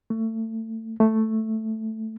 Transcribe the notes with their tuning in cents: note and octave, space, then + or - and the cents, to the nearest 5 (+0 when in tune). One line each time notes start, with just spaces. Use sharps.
A3 +30
A3 +5